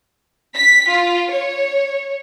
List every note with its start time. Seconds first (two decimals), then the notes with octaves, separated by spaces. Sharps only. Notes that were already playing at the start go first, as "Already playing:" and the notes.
0.55 B6
0.91 F4
1.32 C#5